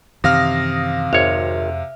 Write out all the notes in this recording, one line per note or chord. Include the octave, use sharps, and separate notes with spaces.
F#2 C3 D#3 E3 F5 D#6 F6 A#6
G#1 F2 C#5 E5